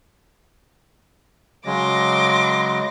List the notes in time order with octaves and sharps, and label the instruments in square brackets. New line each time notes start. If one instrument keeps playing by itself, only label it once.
[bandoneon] C#3 F#3 G#3 [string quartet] C6 D6 A#6